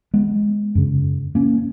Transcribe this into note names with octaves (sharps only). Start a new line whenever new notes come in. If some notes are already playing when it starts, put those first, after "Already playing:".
G#3 B3
F#2 C#3
A#3 C#4